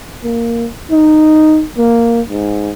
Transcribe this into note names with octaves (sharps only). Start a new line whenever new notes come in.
A#3
D#4
A#3
G#2